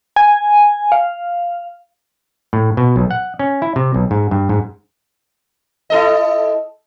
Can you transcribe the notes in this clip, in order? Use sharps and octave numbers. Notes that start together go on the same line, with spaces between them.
G#5
F5
A2
B2
B1
F#5
C#4
E4
C3
B1
G#2
G2
G#2
E4 A4 D#5